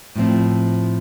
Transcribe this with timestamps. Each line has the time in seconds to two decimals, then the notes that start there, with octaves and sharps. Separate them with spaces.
0.15 A2 F3 C4